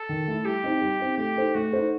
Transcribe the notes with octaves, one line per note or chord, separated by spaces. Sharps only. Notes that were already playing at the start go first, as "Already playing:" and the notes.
Already playing: A4
D#3
A3 E4
G3 G4
C4 D#4
G3
C4 D#4
A3 G4
D#4 A4 C5
A3 F#4
D#4 A4 C5